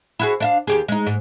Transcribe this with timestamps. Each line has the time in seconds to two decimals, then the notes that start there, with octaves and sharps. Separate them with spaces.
0.19 E4 F#4 G#4
0.40 D4 E5 F5
0.67 D#2 G4 G#4
0.88 G#3 D#4
1.07 G#2